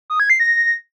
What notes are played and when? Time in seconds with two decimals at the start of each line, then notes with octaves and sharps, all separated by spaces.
0.10 D#6
0.20 G#6
0.30 C7
0.40 A#6